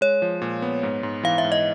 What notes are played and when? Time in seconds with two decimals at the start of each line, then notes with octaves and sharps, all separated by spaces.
0.01 G#3 C#5
0.22 F3
0.42 A#2
0.62 B3
0.83 G#2
1.03 G#2
1.23 E3 F5
1.38 E5
1.45 G#2
1.52 D#5